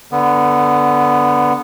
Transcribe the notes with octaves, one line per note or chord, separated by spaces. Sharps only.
D3 B3